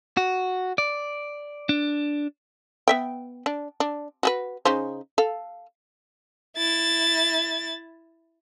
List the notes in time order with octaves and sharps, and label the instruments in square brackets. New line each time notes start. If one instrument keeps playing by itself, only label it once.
[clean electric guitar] F#4
D5
D4
[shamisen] B3 E5 G5
D4
D4
F#4 G#4 B4
C#3 D#4 C5
A4 F5
[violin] E4 A6